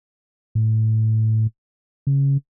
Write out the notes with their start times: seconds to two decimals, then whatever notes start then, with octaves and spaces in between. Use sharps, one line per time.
0.55 A2
2.07 C#3